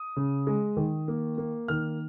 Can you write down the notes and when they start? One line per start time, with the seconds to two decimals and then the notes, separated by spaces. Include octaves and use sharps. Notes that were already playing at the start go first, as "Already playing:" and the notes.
Already playing: D#6
0.16 C#3
0.47 G#3
0.77 D#3
1.08 A#3
1.38 A#3
1.68 D#3 F6